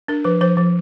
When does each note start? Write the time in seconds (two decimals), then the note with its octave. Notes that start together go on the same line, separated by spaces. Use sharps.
0.08 D4 A#4
0.24 F3 B4
0.41 F3 C5
0.57 F3